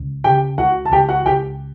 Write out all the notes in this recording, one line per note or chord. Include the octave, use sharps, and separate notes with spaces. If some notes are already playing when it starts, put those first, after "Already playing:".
Already playing: C#2
C#3 G4 G5
C#2 F#4 F#5
A5
C#2 G4 G5
F#4 F#5
C#2 G4 G5